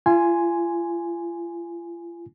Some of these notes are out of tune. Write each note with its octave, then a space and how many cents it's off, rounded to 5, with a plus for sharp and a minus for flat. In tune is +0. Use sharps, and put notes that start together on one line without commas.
F4 -40 G#5 +0 C6 +0